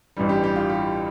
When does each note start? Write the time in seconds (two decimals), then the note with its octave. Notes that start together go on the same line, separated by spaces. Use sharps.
0.17 A1 G2 E3 G3
0.29 G4
0.44 G4
0.56 F4
0.69 G4